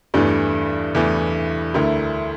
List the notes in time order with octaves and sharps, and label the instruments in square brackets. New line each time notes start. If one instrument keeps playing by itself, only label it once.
[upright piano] E2 E3 A3 [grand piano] G2
[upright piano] E2 E3 A3
D2 D3 A3 E4 A#4